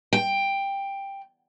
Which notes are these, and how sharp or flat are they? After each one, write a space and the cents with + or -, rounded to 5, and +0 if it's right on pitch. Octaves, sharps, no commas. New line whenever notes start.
G5 +10